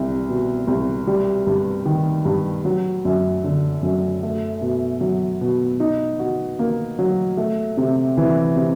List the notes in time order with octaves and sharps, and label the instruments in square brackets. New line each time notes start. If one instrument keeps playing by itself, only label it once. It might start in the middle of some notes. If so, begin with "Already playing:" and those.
Already playing: [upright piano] C2 G3
B2
C2
G3
G2
D#3
G2
F#3
F#2
D3
F#2
A3
B2
F#3
B2
D#4
F#4
A#3
F#3
A3
C3
E3
C3